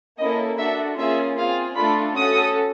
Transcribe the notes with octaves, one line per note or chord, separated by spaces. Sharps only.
A#3 C#4 E4 A4 D#5
D4 F#4 A4 E5
A#3 C#4 F4 G#4 E5
C4 F4 G#4 F5
A3 D4 F4 A4 B5
C#4 F#4 A4 D#6